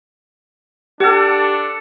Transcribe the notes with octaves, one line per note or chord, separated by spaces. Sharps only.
D4 G4 A4 F#5